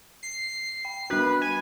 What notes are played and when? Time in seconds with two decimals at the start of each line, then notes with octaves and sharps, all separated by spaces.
0.23 C7
0.85 G5
1.10 G3 D4 F#4 B4
1.42 G#5